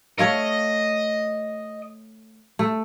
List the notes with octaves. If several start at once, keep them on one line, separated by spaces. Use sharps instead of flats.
A3 C#5 D#5 F5
A3